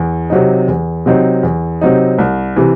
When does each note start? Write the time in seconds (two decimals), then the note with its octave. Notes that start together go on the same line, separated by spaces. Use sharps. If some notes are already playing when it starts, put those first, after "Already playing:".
Already playing: E2
0.30 C3 F#3 C4 D#4
0.68 E2
1.06 C3 F#3 C4 D#4
1.43 E2
1.81 C3 F#3 C4 D#4
2.19 C2
2.56 C3 E3